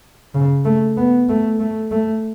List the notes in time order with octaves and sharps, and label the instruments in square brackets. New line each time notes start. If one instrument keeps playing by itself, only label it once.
[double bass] C#3
A3
B3
A3
A3
A3